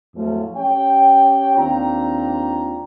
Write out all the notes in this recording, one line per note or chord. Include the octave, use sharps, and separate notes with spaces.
F2 A2 F3 F#3 G#3 A3
C#4 G4 C#5 G5
D#2 C4 D4 F4 G5 A#5